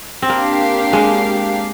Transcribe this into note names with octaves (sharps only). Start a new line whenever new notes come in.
C4
A#3 D4 G4 A#4 F5
G#3